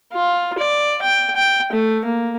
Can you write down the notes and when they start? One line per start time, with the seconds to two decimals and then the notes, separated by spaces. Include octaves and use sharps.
0.14 F4
0.59 D5
1.02 G5
1.36 G5
1.73 A3
2.05 A#3